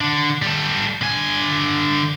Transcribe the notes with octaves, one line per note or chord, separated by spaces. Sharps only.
D3
G3 A4
D3 G#5